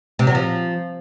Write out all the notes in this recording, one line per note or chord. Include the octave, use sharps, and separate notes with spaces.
C3
F#3
F3